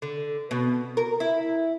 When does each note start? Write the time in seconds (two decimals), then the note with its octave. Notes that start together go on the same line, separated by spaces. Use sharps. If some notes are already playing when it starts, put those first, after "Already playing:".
0.02 D3
0.51 B2
0.97 A#4
1.20 E4